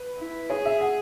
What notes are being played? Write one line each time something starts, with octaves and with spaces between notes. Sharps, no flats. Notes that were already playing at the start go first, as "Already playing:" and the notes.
Already playing: B4
E4
G#4 C#5
E5
F#5